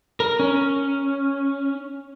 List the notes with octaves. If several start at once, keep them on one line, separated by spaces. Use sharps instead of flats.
A#4
C#4